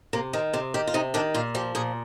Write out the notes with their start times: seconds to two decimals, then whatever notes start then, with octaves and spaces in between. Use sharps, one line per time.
0.13 C3 A#3
0.33 D#3 C4
0.53 C3 C4
0.74 D#3 G4
0.87 F4
0.94 C3 D#4
1.14 D#3 D4
1.34 A#2 F4
1.55 F3 G4
1.75 A#2 G#4